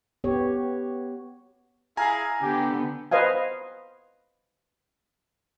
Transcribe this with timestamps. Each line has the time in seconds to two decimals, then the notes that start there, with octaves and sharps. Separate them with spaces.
0.24 B3 G4 C#5
1.97 E4 G#4 F5 G#5 A#5
2.42 D3 B3 G4
3.11 B4 C5 D#5 F5 G#5